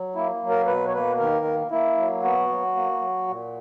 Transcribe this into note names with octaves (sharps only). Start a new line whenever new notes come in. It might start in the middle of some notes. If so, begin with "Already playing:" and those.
Already playing: F#3
A#3 E4
F#3
A#4
B2 B4
C#5
A#3 B4
D#3 A#4
A#3
A#3 E4
F#3
B3 F#4
F#3
A#3
F#3
A#2